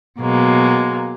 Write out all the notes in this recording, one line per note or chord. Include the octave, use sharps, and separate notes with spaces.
B2 F#3 G#3 A#3